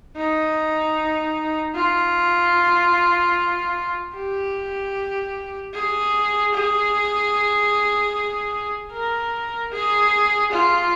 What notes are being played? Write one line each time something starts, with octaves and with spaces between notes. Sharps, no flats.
D#4
F4
G4
G#4
G#4
A#4
G#4
F4